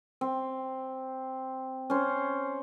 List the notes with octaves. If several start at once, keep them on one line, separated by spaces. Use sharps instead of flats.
C4
C#4 C5